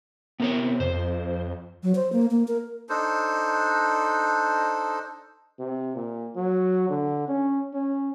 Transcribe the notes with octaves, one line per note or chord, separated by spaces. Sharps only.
C3 B3 A#4 C#5
F2 C5
F#3
C5
A#3
A#3
A#4
D4 D#4 A4 C5
C3
A#2
F#3
D3
C#4
C#4